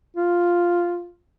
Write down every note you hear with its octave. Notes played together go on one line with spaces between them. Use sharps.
F4